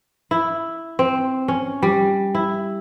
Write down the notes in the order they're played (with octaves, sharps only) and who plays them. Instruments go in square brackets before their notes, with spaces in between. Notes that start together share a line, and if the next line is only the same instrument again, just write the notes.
[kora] E4
C4
C#4
G3
E4